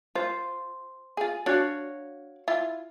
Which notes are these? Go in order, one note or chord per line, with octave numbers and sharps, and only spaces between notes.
F4 C5
F4 G#4
D4 F#4 C#5 F5
E4 F4